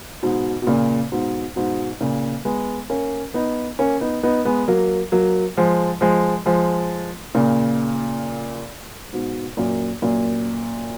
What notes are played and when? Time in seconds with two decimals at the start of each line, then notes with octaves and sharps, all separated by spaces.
0.23 G#2 B2
0.62 B2
0.67 A#2 C#3
1.12 G#2 B2
1.56 G#2 B2
2.01 A#2 C#3
2.45 G#3 B3
2.90 A#3 C#4
3.34 B3 D#4
3.79 A#3 C#4
4.01 B3 D#4
4.23 B3 D#4
4.45 G#3 B3
4.68 F#3 A#3
5.12 F#3 A#3
5.57 F3 G#3
6.01 F3 G#3
6.46 F3 G#3
7.35 A#2 C#3
9.13 G#2 B2
9.57 F#2 A#2
10.02 F#2 A#2